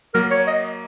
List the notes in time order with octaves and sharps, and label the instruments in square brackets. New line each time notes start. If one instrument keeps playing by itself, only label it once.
[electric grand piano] F#3 A#3 [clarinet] A#4
[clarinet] C#5
D#5